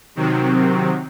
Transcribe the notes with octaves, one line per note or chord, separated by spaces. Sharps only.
C3 D#3 F#3 C4